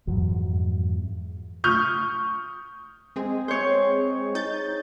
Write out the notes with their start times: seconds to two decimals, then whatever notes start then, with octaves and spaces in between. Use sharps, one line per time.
0.07 F2 G#2 E3 F#3
1.64 C#6 D#6 F6 G6
3.16 G#3 C4 G#4
3.48 C5 C#5
4.35 D#4 G6 A6